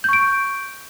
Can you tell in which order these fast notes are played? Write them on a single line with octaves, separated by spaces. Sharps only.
G6 C#6 D7